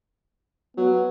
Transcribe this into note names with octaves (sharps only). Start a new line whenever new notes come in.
F#3 B3